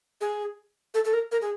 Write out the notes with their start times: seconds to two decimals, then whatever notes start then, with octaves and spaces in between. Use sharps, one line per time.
0.21 G#4
0.94 A4
1.05 A4
1.13 A#4
1.32 A#4
1.42 G#4